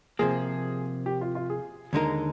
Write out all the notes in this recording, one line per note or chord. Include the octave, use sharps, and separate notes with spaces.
C3 F3 A#3 G#4
G4
F4
F4
G#4
D#2 D3 G#3 D#4 A#4